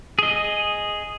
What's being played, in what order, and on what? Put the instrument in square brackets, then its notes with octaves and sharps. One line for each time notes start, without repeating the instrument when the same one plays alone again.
[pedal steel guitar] G#4 D#5